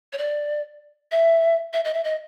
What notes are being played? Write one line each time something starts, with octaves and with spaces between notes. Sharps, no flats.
C#5
D5
E5
E5
D#5
E5
D#5